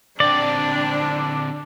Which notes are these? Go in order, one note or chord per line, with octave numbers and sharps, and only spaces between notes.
D3 C4 D4 D5